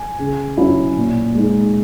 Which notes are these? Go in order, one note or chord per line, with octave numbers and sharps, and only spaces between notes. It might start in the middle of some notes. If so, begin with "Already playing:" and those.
Already playing: G#5
C#3
F#3 C#4 E4
A#2
G#3 D#4